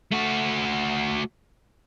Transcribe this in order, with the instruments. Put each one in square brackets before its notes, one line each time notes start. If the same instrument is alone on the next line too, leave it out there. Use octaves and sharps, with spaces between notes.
[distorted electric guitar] A3 F#4